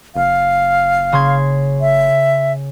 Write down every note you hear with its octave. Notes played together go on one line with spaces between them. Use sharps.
F#1 F5
C#3 C6 G#6
E5